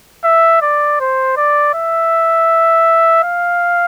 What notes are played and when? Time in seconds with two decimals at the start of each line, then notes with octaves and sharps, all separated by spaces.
0.25 E5
0.62 D5
1.00 C5
1.37 D5
1.74 E5
3.24 F5